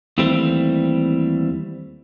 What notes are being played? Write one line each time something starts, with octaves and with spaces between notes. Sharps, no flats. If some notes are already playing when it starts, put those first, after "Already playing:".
D#2 E3 G3 A3 C4